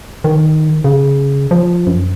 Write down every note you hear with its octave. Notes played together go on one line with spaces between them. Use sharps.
D#3
C#3
F3
F#2